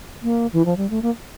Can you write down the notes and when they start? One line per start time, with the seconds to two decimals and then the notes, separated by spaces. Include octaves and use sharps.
0.23 A#3
0.53 E3
0.65 F3
0.77 G3
0.90 A3
1.02 A#3